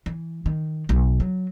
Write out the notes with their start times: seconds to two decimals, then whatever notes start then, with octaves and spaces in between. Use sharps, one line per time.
0.06 E3
0.46 D#3
0.89 B1
1.20 F#3